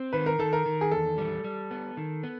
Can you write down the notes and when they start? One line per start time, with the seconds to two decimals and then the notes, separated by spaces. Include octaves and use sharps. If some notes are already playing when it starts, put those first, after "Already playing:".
Already playing: C4
0.12 D#3 B4
0.26 A#4
0.39 D#3 A4
0.53 A#4
0.66 D#3
0.81 G#4
0.91 E2 A4
1.18 G3
1.44 G3
1.71 B3
1.97 D#3
2.23 B3